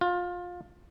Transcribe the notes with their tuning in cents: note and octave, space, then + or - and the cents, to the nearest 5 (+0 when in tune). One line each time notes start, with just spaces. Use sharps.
F4 +25